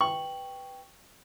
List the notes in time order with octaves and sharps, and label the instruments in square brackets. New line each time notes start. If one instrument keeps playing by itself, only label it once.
[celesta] B4 G5 F#7 [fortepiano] C#6